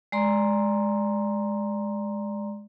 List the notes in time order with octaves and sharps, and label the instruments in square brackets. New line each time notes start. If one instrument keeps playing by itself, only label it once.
[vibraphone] G#3 D5 A#5 C6